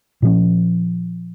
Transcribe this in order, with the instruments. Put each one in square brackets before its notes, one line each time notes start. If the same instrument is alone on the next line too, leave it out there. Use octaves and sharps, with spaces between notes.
[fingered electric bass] A#2 F3 C#4